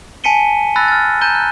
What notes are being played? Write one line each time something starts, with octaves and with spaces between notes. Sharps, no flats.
G#5 A5 B6 C#7 D#7 G7
B5 E6 F#6 A6 A#6
F6 A6
A#5 G6 D#7 G7
F#6